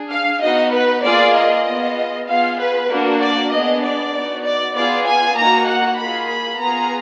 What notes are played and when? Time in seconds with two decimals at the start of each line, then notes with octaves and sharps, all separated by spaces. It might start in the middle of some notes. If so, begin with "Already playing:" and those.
Already playing: D4 G#4
0.11 F5
0.42 B3 D#4 F#4 D#5
0.73 B4
1.03 A#3 F4 G#4 D5
1.35 D#5
1.66 B3 F4 G#4
2.27 B3 F4 G#4 F5
2.59 B4
2.89 A#3 D4 F#4
3.21 D5
3.51 B3 D4 G#4 D#5
3.82 D5
4.13 B3 D#4 F#4
4.44 D5
4.75 B3 F4 G#4 D5
5.06 G#5
5.36 A#3 D#4 F#4 A#5
5.68 F#5
5.98 A#3 F4 G#4 B5
6.28 B5
6.59 B3 F4 G#4 A#5